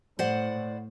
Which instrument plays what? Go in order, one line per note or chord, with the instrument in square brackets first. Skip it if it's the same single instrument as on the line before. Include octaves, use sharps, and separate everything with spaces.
[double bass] A2 [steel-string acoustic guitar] C5 D5 F#5